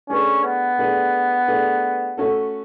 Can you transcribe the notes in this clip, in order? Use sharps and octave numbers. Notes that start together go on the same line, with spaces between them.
A3 C#4 D4 G#4 B4
B3
A3 D4 G#4 B4
A3 D4 G#4 B4
A3 C#4 F#4 A4